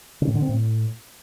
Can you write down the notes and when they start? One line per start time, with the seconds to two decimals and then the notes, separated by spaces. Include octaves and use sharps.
0.22 C#3
0.28 A2
0.35 D3
0.42 C4
0.49 A2